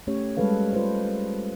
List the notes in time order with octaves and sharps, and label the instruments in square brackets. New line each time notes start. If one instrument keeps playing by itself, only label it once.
[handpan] A3 C#4 G4 C#5
G3 G#3 A4 B4 F5
F4 B4 C5